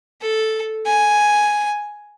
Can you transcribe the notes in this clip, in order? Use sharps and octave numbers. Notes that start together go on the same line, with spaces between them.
A4
G#5